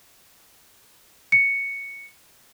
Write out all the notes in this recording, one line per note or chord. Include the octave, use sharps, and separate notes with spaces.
C#7